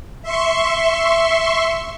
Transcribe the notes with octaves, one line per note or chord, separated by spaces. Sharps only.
E5 C6 C#6